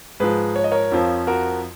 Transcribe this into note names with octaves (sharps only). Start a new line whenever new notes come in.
G#2 F3 G#4 B4
C#5
D#5
A#4 C#5
F2 F3
F#4 A#4